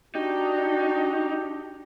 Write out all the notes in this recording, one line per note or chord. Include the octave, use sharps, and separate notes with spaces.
D4 D#4 F#4 G4